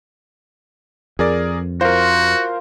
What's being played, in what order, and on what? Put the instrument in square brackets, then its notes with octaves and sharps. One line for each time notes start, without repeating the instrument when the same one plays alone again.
[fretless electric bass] F2 [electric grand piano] G#4 A#4 D5
[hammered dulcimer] F4 [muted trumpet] F#4 [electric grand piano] A#4 C5